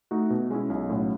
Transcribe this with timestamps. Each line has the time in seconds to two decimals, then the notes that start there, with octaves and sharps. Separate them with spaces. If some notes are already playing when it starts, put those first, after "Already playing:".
0.11 A3 D#4 F#4
0.30 B2
0.50 G#3 C#4 E4
0.70 B1
0.89 A2 F#3 C#4